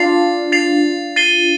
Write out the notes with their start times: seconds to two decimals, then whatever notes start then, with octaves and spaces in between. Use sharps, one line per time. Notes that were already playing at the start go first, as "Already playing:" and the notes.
Already playing: D4 F4 A6 C7 F7
0.52 A6 C7 F7
1.16 A6 C7 D#7 G7